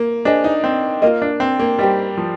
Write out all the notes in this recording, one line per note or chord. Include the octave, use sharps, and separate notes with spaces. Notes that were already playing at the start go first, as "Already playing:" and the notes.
Already playing: A#3
D4 G#4 C5 D#5 G#5
D#4
C4
A#3 F4 A#4 D#5
D4
C4
A#3
G3 D#4 G4 C5
F3